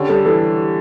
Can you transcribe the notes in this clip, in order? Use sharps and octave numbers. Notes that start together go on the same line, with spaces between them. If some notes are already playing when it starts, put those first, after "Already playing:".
Already playing: D3 C#4 G4
G3 A4
E3 A4